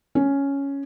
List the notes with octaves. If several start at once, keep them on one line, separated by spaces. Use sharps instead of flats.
C#4